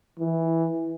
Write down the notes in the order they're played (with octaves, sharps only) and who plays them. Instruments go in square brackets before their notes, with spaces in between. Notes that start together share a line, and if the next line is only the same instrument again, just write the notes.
[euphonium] E3